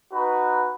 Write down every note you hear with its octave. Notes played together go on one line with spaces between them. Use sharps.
D#4 F#4 B4